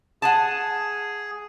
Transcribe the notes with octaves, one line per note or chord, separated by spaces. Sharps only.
G#4 F#5 G#5 A5